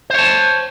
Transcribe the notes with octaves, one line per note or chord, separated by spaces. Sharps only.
C5 C#5 A5